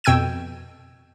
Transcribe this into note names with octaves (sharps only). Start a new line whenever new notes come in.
F2 B2 G5 E6 G#6 D#7